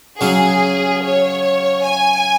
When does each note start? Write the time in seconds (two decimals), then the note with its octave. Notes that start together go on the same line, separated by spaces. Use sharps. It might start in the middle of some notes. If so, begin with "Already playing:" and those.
0.21 C#3 F#3 C#4 G#4
1.03 C#5
1.84 G#5